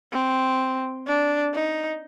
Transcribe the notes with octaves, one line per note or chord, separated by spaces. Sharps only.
C4
D4
D#4